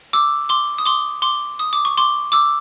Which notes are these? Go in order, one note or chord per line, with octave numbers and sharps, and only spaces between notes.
D6 E6
C6 D6
D#6
C6 D6
C6 D6
D#6
D6
C#6
C6 D6
D6 E6